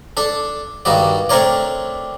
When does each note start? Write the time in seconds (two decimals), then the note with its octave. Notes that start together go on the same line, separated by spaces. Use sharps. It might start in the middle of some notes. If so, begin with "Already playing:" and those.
0.17 D4 A4
0.85 G2 D#3 G3 F#4 D5
1.29 A3 C4 D4 A#4 C#5 D5